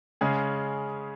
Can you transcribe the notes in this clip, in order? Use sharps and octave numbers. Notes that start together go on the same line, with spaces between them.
C#3 G#3 C#4 G#4